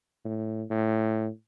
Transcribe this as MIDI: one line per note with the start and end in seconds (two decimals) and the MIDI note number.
0.25 0.63 45
0.70 1.28 45